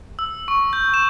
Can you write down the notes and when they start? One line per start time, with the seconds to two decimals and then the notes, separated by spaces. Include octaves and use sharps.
0.19 E6
0.48 C#6
0.73 G6
0.94 E7